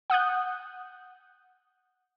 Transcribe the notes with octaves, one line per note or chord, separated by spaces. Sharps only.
F#5 D#6 F#6 G6